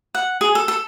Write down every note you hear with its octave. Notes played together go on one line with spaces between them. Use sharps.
F#5
G#4
A4
A4